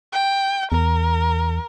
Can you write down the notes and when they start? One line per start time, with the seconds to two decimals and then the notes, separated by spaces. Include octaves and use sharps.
0.13 G5
0.72 E2 A#4